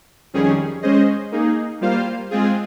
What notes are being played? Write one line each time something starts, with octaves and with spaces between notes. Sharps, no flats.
F2 D#3 G3 C#4 G#4
G#3 C#4 G#4 C5 D#5
A#3 D#4 G#4
G3 A#3 F4 C5 F5
G#3 C4 F4 G#4